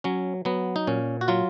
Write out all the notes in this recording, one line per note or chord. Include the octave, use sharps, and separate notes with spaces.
F#3 C#4
F#3 B3
D#4
A#2 C#4
F#4
F#3 F4